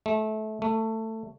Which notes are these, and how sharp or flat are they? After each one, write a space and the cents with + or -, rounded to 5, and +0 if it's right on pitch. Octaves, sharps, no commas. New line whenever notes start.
A3 -25
A3 +15